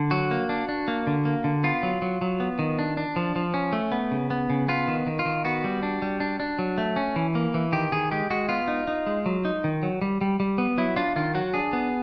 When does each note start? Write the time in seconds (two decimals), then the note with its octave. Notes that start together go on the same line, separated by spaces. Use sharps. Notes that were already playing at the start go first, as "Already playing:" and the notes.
Already playing: D3
0.11 F#3 F#4
0.31 A#3
0.49 D4
0.69 D4
0.88 A#3
1.07 D3
1.25 A#3
1.44 D3
1.64 B3 F4
1.83 F#3
2.02 F#3
2.21 F#3
2.40 B3
2.59 D#3
2.79 D4
2.97 D4
3.16 F3
3.36 F3
3.54 C#4
3.73 A3
3.92 B3
4.11 C#3
4.30 B3
4.50 C#3
4.68 B3 F4
4.88 D#3
5.07 D#3
5.19 F4
5.25 D#3
5.45 B3 F#4
5.64 G3
5.83 D4
6.02 G3
6.20 D4
6.40 D4
6.59 F#3
6.78 A3
6.96 C#4
7.16 E3
7.35 A#3
7.54 E3
7.72 D#3 G4
7.92 D#3 G#4
8.11 G#3 G4
8.30 G#3 F#4
8.49 B3 F4
8.68 D#4
8.87 D#4
9.07 G#3
9.26 F#3
9.45 D#4
9.64 D#3
9.83 F#3
10.01 G3
10.21 G3
10.40 G3
10.58 B3
10.78 F#3 E4
10.96 D4 F4
11.16 D#3 F4
11.35 F#3 F#4
11.54 D4 G#4
11.73 B3